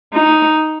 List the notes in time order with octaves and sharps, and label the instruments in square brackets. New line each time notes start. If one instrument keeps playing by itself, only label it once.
[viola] D#4